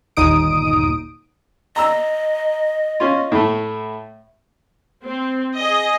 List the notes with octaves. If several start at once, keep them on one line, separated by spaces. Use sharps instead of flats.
G1 D#2 A#2 D#4 D#6 D7
D#5 A#5 E6
C#4 F4
A2 A3
C4
G#4 D#5